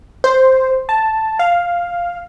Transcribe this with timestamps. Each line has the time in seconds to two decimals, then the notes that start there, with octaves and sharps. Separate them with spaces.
0.24 C5
0.89 A5
1.39 F5